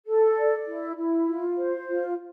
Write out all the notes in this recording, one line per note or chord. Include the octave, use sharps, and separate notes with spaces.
A4
D5
E4
E4
F4
C5
F4